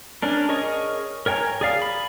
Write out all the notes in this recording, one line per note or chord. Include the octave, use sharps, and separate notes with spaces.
C#4 D4 A#4
G#4 A#4 C#5 D#5 C#6
A#4 C#5 G5 G#5 A#5
G#4 D5 F5
B5